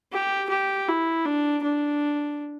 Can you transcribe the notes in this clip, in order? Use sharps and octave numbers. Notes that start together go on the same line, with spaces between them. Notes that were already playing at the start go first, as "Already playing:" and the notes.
G4
G4
E4
D4
D4